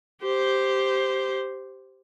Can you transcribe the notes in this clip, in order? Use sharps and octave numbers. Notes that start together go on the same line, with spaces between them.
G4 C5